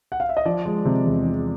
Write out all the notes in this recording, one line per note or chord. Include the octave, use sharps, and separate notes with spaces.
F#5
F5
E5
D#5
F3 D5
G#3
C3
E2
F3